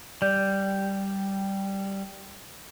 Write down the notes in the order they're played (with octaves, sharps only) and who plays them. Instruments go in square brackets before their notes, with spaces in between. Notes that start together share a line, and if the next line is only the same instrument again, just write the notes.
[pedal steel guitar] G3 [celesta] D5 G6